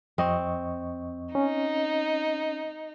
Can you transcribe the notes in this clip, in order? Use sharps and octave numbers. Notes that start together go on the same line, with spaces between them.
F2 C4 D#5 C#6
C#4 D#4